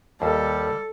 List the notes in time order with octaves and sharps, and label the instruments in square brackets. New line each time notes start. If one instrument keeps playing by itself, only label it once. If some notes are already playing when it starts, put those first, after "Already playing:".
[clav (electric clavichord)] D#2 [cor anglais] G3 [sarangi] A4